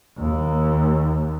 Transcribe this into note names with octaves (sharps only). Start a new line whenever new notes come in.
D#2